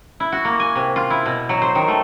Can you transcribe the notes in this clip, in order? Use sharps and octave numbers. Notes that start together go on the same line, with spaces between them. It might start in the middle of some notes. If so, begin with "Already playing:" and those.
E4
F#4
A#3
G#5
C3
F4
E4
B2
F#3
C5
D#3
A3